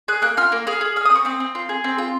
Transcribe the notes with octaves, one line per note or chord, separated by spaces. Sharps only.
G#4 F#6
A#3 F#6
F4 F6
A#3
G#4 F6
G#4
G#4 F6
C4 D#6
C#6
C4 D#6
C4
F4
G#4
C4
F4